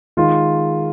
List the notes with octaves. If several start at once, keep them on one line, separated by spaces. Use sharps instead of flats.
D#3 G#3 F4